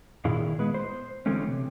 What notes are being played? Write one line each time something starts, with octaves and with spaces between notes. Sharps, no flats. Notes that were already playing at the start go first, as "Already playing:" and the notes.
A#2 D#3 E4 G#4 F5
G#3 B3 B4
C5
D3 E3 G#3 A3 C4 C#4
C3